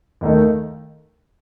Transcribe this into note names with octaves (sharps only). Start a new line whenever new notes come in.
D#2 D#3 A3 D#4